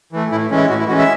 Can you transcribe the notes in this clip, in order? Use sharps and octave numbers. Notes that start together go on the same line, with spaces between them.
E3 A3
A2 E4
E3 G#3 C#4
E4
A2 F#4
E4
E3 G#3 C#4 F#4
E5